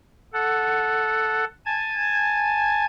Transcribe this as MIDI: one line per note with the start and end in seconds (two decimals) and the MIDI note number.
0.33 1.44 69
0.33 1.44 78
1.66 2.86 80
1.66 2.86 81
1.66 2.86 92